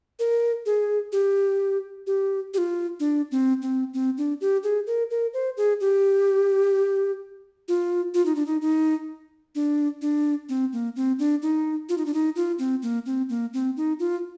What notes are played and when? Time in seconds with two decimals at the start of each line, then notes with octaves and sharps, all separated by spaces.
0.19 A#4
0.66 G#4
1.12 G4
2.07 G4
2.54 G4
2.58 F4
3.00 D4
3.32 C4
3.62 C4
3.94 C4
4.17 D4
4.41 G4
4.63 G#4
4.87 A#4
5.11 A#4
5.33 C5
5.57 G#4
5.81 G4
7.68 F4
8.14 F4
8.26 D#4
8.35 D4
8.46 D#4
8.61 D#4
9.55 D4
10.02 D4
10.49 C4
10.73 A#3
10.96 C4
11.19 D4
11.42 D#4
11.89 F4
11.98 D#4
12.06 D4
12.14 D#4
12.36 F4
12.59 C4
12.82 A#3
13.06 C4
13.29 A#3
13.54 C4
13.77 D#4
13.99 F4